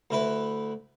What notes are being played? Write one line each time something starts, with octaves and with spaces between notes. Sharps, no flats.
D2 E4 B4